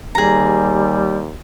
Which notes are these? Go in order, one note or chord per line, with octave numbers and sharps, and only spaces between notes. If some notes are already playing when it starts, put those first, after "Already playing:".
D#2 G3 G#4 A#5